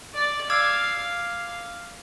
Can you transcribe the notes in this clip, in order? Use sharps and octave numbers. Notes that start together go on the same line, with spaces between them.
D5
F5 D6 E6 G#6